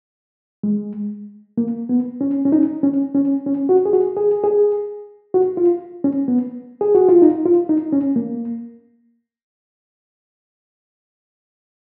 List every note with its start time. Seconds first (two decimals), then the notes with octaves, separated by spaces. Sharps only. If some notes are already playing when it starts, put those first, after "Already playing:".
0.63 G#3
1.58 A#3
1.89 B3
2.21 C#4
2.45 C#4
2.52 D#4
2.83 C#4
3.15 C#4
3.46 C#4
3.69 F#4
3.86 G#4
3.93 F#4
4.17 G#4
4.44 G#4
5.34 F#4
5.57 F4
6.04 C#4
6.28 B3
6.81 G#4
6.95 F#4
7.09 F4
7.22 D#4
7.46 F4
7.69 D#4
7.93 C#4
8.16 A#3